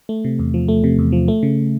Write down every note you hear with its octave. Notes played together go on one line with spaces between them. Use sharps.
A3
C3
E2
F3
A3
C3
E2
F3
A3
C#3